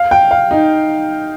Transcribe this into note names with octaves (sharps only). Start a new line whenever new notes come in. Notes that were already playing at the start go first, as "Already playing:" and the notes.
Already playing: F5
G5
F5
D#4